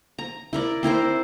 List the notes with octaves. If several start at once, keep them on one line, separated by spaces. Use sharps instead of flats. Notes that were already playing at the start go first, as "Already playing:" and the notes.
A#5
E4 A#4 D5
C4 E4 A#4 C5